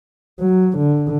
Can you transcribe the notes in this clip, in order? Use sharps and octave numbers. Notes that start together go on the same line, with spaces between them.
F#3
D3